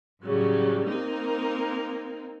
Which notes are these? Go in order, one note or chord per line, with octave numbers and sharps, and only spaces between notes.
A2 C#3 F#3 G3
A#3 C4 D#4 A#4